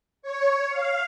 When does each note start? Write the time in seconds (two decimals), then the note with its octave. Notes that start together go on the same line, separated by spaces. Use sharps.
0.22 C#5
0.69 F5